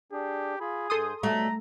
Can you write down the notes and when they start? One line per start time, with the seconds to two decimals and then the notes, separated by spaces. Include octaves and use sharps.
0.12 D4 G4 G#4
0.61 F4 G#4 B5
0.90 G2 A4 C6 D#6 G6
1.23 B2 F#3 G3 A3 A#5